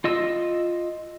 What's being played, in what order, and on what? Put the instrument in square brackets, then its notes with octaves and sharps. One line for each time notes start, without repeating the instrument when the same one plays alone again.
[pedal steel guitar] F4 D#5 E6